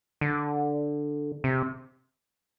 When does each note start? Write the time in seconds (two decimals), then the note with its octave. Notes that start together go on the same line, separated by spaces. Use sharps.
0.21 D3
1.44 C3